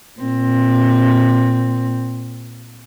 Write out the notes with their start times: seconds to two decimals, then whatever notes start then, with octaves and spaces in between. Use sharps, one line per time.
0.20 A#2 C4